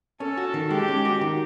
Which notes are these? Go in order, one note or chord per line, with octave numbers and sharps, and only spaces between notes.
C#4 A4
F#4
D#3
G#3 G4
C#4
F#4
D#3